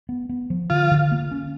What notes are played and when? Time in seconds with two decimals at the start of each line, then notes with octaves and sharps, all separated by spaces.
0.09 B3
0.29 B3
0.50 F3
0.70 D3 F4
0.91 D3
1.12 A#3
1.31 C#4